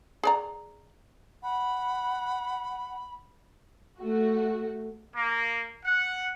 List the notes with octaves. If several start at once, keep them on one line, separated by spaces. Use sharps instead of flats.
G#4 D5 A#5
F#5 B5
A3 F#4
A#3
F#5